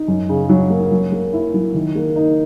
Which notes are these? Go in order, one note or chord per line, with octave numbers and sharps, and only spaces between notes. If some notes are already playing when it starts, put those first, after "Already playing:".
Already playing: D#4
F#2
C#3
F#3
A#3
F#3
A#3
E4
F#3
D#3
A#3
D#4